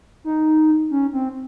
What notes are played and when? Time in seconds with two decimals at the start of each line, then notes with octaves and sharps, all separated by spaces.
0.24 D#4
0.91 C#4
1.13 C4